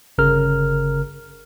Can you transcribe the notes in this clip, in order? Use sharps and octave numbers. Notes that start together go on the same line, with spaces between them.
G1 C#3 A#4 F6